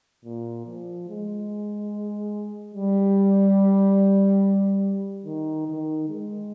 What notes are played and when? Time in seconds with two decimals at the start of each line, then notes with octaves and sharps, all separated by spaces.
0.25 A#2
0.66 F3
1.08 G#3
2.75 G3
5.25 D#3
5.67 D#3
6.09 G#3